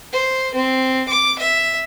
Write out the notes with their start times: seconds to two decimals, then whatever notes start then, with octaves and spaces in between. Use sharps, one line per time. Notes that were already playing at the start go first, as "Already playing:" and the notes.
0.12 C5
0.54 C4
1.08 D6
1.39 E5